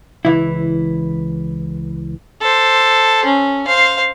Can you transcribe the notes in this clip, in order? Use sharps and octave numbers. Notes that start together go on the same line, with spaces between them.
C#2 E3 E4
A4 C5
C#4
C5 F5